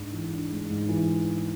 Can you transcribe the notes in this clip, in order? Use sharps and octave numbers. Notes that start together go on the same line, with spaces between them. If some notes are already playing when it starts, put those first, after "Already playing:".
Already playing: G#2 G#3 D4
E3
D4
G#3
G#2
E3